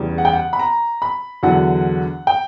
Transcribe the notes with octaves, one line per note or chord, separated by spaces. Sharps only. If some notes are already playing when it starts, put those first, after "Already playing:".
Already playing: E2 C#3 G3
F#5
G5
F#5
B5
A#5
B5
E2 D3 F#3 F#5
G5